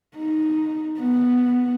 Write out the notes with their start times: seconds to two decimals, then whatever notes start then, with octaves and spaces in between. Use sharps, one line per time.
0.16 D#4
1.00 B3